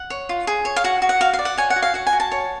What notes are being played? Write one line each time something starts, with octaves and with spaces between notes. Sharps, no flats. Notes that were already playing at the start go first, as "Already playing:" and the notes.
Already playing: F#5
C#5
F4
G#4
C#5
F5
F#4 F#5
F#4
F#5
F#4 F5
F5
D5
F#5
C#5 G#5
F#5
F#4
F5
F#4 F#5
G#5
F#4
A5
C#5